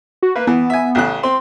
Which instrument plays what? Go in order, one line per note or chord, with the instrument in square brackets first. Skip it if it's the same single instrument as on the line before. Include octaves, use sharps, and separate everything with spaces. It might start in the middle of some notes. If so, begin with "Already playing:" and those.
[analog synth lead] F#4
[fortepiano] A#3 [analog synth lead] B4
[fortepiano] E3 [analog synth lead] B3
[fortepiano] E5 G#5
A1 C#3 F#6
[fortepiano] C4 [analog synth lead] C6